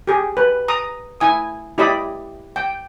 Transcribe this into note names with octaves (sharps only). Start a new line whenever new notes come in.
G4 G#4
B4
A#5 D#6
E4 G#5 D#6
E4 G4 D5 D#5 B5
G5